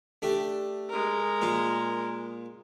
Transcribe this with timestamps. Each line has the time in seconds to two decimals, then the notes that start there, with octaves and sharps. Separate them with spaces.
0.22 A3 D4 G4
0.89 G#3 A#4
1.41 A#2 F4